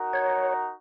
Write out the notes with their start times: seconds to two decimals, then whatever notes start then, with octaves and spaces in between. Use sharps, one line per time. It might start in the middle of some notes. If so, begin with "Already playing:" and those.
Already playing: D#4 F#4 A#4
0.13 C#5